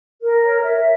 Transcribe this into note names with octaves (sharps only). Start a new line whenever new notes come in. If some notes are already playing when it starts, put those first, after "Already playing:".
A#4
C#5
E5